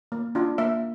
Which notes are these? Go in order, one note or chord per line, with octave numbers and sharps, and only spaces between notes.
A#3
D4 F4
A#3 E5